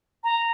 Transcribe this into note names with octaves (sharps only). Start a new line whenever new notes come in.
A#5